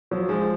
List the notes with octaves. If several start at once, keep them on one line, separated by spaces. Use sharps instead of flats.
F3 F#3
F3 G#3